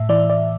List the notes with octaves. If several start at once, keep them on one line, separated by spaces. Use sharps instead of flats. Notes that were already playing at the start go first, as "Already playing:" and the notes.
Already playing: A2 E5
E3 D5
D5